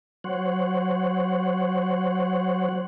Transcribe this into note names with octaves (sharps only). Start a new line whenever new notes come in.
F#3 C5 C#5 F#5